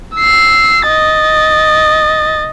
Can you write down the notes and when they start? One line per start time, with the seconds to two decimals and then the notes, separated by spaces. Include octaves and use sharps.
0.16 E6 C7
0.88 D#5 A6